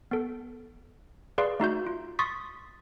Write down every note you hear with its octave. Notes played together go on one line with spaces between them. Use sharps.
B3 A4
G#4 B4 D5 F5 C6
A3 D#4 F#4 G6
F4
C6 C#6 D#6 A6 B6